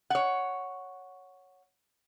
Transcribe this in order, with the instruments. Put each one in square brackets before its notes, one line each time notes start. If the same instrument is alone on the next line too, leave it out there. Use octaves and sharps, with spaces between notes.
[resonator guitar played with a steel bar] C#5 F#5